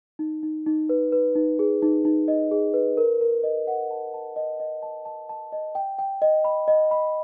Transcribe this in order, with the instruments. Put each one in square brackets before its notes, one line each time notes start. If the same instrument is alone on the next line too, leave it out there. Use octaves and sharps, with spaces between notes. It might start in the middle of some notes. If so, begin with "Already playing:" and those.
[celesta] D#4
D#4
D#4
B4
B4
D#4
G#4
D#4
D#4
D#5
G#4
B4
A#4
A#4
D#5
F#5
A5
A5
D#5
D#5
A5
A5
A5
D#5
G5
G5
D#5
B5
D#5
B5